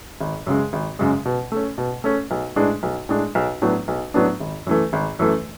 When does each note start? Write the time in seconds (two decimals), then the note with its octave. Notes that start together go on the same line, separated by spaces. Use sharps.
0.21 G#1
0.47 F#2 C#3 G#3
0.73 G#1
0.99 F#2 C#3 G#3
1.25 B2
1.52 A3 C#4
1.78 B2
2.04 A3 C#4
2.31 B1
2.56 A2 G#3 D4
2.83 B1
3.09 A2 G#3 D4
3.35 B1
3.62 A2 F#3 B3 D4
3.88 B1
4.14 A2 F#3 B3 D4
4.40 G#1
4.67 F#2 E3 A3
4.93 G#1
5.19 F#2 E3 A3